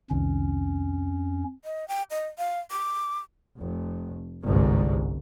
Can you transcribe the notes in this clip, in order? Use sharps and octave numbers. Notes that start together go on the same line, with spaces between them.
C2 F2 D#3 C#4
D#5
G5
D#5
F5
D6
F1
G1 C2 G#2